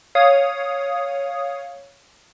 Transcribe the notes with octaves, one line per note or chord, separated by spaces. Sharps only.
C#5 F5 D#6